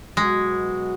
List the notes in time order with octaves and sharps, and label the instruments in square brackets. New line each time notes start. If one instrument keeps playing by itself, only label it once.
[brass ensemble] B2 F#3 B3 F#4 [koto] G#3